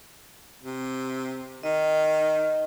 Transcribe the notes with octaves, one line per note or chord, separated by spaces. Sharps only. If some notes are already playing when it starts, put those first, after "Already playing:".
C3
D#3 D#5